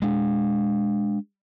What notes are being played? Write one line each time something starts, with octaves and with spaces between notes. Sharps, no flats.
G#3 D4